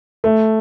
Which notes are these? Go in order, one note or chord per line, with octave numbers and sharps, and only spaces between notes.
A3